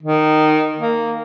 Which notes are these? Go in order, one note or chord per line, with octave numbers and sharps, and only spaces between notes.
D#3
A#3